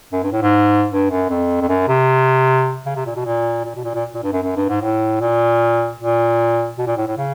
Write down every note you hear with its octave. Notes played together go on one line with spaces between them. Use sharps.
F#2
G2
A2
G#2
G2
F#2
F2
F2
F#2
C3
C#3
C3
A#2
B2
A#2
A#2
B2
A#2
A#2
A#2
G2
F#2
F#2
G2
G#2
A2
A#2
A#2
B2
A#2
A2
A2
C#3